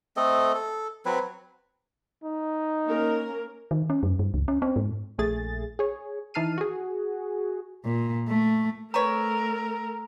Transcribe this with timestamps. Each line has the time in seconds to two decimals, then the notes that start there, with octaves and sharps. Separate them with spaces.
0.17 A3 C4 A4 D#5
0.55 A4
1.05 F#3 C4 B4
2.24 D#4
2.85 A#3 C#4 A#4
3.71 D#3
3.90 C#4
4.03 F#2
4.19 G2
4.34 C#2
4.48 C#4
4.62 C4
4.76 G#2
5.18 A#1 A3 G#4 A6
5.79 G#4 C#5
6.34 E3 D#4 A5 F6 C7 D#7
6.58 F#4 G#4
7.85 A#2
8.28 A3
8.94 A3 C4 A#4 B4 C#5 A#5